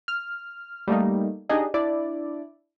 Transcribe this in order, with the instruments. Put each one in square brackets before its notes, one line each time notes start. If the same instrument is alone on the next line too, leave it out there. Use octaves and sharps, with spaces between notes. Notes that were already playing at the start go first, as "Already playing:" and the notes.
[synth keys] F6
G3 A3 A#3 D#4
D4 D#4 G4 G#4 D#5
D4 E4 D5